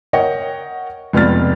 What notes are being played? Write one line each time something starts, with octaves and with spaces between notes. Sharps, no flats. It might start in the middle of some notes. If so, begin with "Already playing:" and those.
A#4 C#5 D#5 F#5 G5
F1 C#2 B3 D5 F6 A6